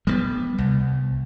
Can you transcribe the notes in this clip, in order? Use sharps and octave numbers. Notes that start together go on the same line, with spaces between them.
G3 G#3 B3
C2